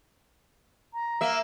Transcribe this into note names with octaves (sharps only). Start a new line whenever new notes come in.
A#5
A#3 E5